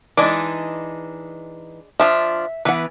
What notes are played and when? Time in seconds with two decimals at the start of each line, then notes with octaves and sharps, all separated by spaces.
0.17 E3 G#3 D4 D#4 D5
2.00 F3 D4 F4 E5
2.65 E3 B3 B4 F#5